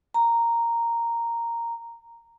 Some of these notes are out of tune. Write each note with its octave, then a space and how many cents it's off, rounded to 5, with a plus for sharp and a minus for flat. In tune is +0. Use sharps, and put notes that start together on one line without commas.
A#5 -5